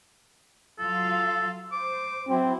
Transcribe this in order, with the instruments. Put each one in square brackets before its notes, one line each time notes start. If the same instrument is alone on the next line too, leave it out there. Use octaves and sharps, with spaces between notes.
[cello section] F#3 F4 F5 [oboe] A4
[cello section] C5 [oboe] D6
[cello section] F#3 E4 F#4 [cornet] C4